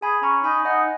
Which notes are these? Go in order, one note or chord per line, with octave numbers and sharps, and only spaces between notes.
G#4 G#5 B5
C#4 A#5 C#6
D#4 G#5 B5
G#5
D#4 D#5 F#5